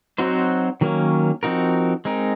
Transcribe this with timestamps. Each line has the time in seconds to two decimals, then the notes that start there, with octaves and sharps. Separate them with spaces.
0.18 F#3 C4 D#4 F#4 C5
0.81 D#3 F#3 A#3 C#4
1.43 F3 C4 D#4 F#4 A#4
2.05 G#3 C4 D#4 A#4